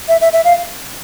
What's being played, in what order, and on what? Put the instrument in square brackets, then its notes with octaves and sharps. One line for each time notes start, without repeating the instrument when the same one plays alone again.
[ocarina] E5
E5
E5
F5